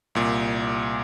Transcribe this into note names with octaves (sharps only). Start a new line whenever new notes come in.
C2 A#2